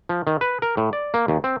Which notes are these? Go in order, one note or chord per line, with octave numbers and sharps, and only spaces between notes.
F3
D#3
B4
A#4
A2
D5
A#3
D#2
C4